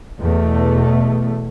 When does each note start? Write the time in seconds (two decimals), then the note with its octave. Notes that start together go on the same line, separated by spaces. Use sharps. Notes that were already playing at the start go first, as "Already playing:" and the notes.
0.22 E2 B2 A3